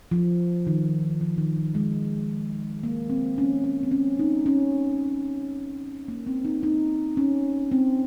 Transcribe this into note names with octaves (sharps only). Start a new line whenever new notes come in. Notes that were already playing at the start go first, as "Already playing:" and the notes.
F3
D#3
F3
D#3
F3
G#3
A#3
C4
C#4
C#4
C4
C#4
D#4
C#4
A#3
C4
D#4
D#4
C#4
C4